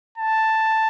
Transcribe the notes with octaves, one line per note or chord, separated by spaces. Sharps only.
A5